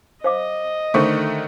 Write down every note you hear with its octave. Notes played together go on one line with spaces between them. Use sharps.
C5 D#5 F5 D6
D3 D#3 A3 C5 C6 C#6